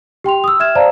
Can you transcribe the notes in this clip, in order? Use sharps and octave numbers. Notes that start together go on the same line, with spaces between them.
G4 G5 C6 F7
D#6 E6
E5 F6 G#6 E7
C5 D5 F5 A5 A#5